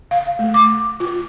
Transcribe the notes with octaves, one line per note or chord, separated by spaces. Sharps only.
F5
A3
D6
F4